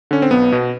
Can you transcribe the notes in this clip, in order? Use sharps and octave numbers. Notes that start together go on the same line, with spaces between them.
D3 C#4
C4
B1 B3
B2